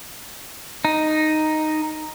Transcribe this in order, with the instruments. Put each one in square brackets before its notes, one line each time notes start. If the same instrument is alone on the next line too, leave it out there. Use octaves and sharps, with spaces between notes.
[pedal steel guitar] D#4